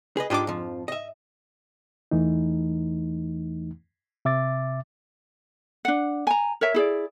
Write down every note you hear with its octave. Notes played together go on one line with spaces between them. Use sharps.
G#4 B4 D#5
G#2 D4 F4 G4 D#5 D6
F2 F3
D#5 E5
E2 E3 A3 D#4
C3 E5 D6 A6
D4 F#5
G#5 A#5
A#4 C#5 E5
E4 G#4 D5